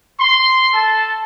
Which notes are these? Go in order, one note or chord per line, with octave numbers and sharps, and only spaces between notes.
C6
A4 A5